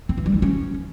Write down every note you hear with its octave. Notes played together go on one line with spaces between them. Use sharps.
C4
E3
G3
D#4
C#4